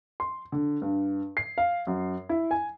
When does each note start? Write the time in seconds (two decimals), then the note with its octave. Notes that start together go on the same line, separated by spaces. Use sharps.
0.20 C6
0.52 D3
0.82 G2
1.37 C7
1.58 F5
1.87 F#2
2.29 E4
2.51 G#5